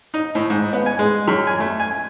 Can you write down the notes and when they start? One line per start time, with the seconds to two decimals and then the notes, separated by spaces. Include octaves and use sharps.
0.14 D#4
0.35 A2
0.50 G#2
0.73 B3
0.86 G#5
0.99 G#3
1.28 F#2
1.47 G#5
1.60 A3
1.80 G#5